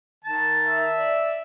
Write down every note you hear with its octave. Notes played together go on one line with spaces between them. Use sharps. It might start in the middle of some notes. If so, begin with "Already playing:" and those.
D#3 A5
E5
D5